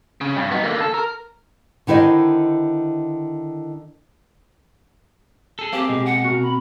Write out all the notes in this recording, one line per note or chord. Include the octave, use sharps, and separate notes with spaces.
C#3
G2
B3 D#4
D3 A#3
A4
A#4
D3 D#3 E4 C5 D#5
G#4 A4
A#3 C4 G4
B2 G#3
F#5
F#4 A#4
B5